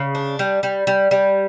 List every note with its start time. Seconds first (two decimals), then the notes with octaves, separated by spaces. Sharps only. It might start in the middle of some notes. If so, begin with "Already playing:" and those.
Already playing: C#3
0.15 D4
0.39 G3
0.63 G3
0.87 G3
1.11 G3